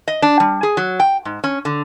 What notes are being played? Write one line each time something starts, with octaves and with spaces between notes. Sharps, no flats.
D#5
D4
G3
G#4
F#3
G5
G#2
C#4
D3